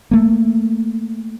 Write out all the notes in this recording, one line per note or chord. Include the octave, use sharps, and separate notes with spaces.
A3 A#3